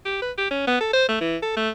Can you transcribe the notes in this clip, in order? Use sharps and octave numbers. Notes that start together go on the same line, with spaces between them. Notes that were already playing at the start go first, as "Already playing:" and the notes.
G4
B4
G4
C#4
B3
A4
C5
A3
E3
A4
A3